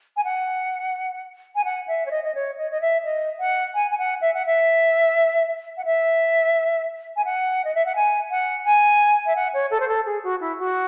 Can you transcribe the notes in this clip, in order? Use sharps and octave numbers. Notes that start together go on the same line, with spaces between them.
G#5
F#5
G#5
F#5
E5
C#5
D#5
D#5
C#5
D#5
D#5
E5
D#5
F#5
G#5
G#5
F#5
E5
F#5
E5
F#5
E5
G#5
F#5
D#5
E5
F#5
G#5
F#5
G#5
E5
F#5
C#5
A4
C5
A4
G#4
F#4
E4
F#4